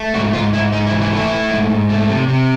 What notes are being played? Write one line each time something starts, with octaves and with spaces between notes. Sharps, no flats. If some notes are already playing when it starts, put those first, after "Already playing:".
Already playing: A3
G#2 F#4
G#2 F4
G#2 E4
G#2 D#4
E4
E3
E4
A3 E4
A3
G#2
G#2
A3
C3
C3